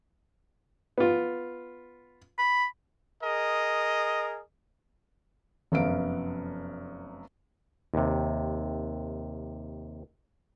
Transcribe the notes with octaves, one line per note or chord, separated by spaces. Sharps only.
B3 F4
B5
G#4 A#4 D#5
F1 F#2 B3 F5 D7
D#2 C3